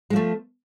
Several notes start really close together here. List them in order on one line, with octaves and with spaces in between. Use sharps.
G#3 F3 A3